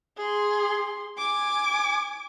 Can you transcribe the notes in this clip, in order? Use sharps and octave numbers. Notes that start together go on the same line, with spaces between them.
G#4 C6
G#5 D6